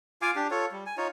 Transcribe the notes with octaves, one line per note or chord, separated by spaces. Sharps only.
F4 F5 G#5 D6
D4 G4
F4 A4 C#5
G3
G#5
D#4 F4 C#5